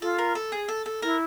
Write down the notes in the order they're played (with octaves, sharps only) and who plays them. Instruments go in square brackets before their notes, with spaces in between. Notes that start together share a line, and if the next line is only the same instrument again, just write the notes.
[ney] F4 [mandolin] A4
[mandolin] A#4
A4
G#4
A4
A4
[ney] E4 [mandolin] A#4